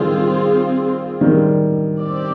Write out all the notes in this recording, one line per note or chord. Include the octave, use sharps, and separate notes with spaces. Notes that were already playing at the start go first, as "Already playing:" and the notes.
Already playing: D#3 G3 C4 F4 G#4
D#3 G3
C4 G4 D5